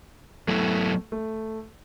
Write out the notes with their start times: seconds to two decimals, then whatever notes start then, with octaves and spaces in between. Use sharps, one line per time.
0.48 F#3 A3 B3 E4
1.12 A3